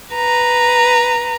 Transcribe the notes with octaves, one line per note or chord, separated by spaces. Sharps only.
B4 A#5